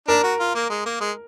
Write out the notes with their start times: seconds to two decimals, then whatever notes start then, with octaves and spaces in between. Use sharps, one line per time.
0.08 D4 A#4
0.23 F#4
0.39 F4
0.55 A#3
0.70 G#3
0.86 A#3
1.00 G#3